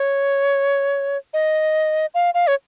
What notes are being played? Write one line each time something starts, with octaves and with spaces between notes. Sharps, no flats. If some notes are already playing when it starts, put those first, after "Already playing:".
Already playing: C#5
D#5
F5
F5
C#5